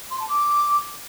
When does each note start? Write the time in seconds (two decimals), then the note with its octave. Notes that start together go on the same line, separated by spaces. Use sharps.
0.11 C6
0.20 A5
0.28 D6